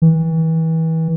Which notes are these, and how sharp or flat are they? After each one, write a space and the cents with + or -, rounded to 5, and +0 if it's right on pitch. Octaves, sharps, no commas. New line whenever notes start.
E3 -30